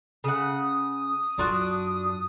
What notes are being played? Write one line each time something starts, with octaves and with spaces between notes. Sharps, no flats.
C#3 F#5 D#6
F#2 D4 F4 F#4